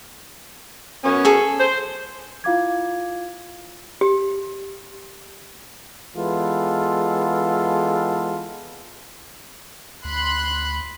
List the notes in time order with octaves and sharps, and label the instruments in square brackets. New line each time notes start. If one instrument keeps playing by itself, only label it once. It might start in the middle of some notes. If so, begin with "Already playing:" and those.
[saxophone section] F#2 B3 C#4
[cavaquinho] G#4 A4
[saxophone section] C5
[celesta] E4 F4 F5 D6 G#6
[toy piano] G4
[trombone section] E3 G#3 B3 F4 A4
[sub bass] D2 [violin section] B5 C6 F#6